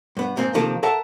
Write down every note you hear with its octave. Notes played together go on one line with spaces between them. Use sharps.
G2 B3
F2 G#2 A#3 C4
C3 D#3 F3 A#3 A4
A4 A#4 E5 F#5 A5 A#5